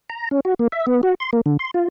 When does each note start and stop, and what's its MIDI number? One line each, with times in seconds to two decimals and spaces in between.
0.10 0.29 82
0.31 0.40 61
0.45 0.54 66
0.59 0.68 58
0.72 0.86 76
0.87 1.01 59
1.03 1.15 66
1.20 1.30 84
1.33 1.41 58
1.46 1.57 50
1.59 1.71 84
1.74 1.88 65